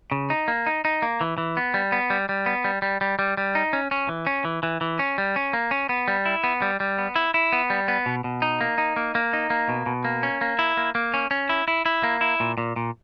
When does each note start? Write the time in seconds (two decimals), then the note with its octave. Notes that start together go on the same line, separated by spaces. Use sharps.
0.12 C#3
0.30 D#4
0.48 A#3
0.66 D#4
0.85 D#4
1.02 A#3
1.21 E3
1.38 E3
1.57 B3
1.74 G3
1.92 B3
2.10 G3
2.29 G3
2.46 B3
2.64 G3
2.82 G3
3.01 G3
3.19 G3
3.37 G3
3.55 D#4
3.73 C#4
3.91 C#4
4.09 E3
4.27 C#4
4.45 E3
4.63 E3
4.81 E3
4.99 C#4
5.18 G3
5.36 C#4
5.53 A#3
5.71 C#4
5.89 B3
6.08 G3
6.26 E4
6.44 B3
6.62 G3
6.80 G3
6.98 B3
7.16 E4
7.34 E4
7.53 B3
7.70 G3
7.88 B3
8.06 B2
8.24 B2
8.42 D#4
8.61 A#3
8.78 D#4
8.96 A#3
9.15 A#3
9.33 D#4
9.50 A#3
9.69 B2
9.86 B2
10.05 A#3
10.23 C#4
10.41 A#3
10.59 E4
10.77 A#3
10.95 A#3
11.14 C#4
11.31 C#4
11.49 E4
11.68 E4
11.86 E4
12.04 A#3
12.21 E4
12.40 A#2
12.58 A#2
12.76 A#2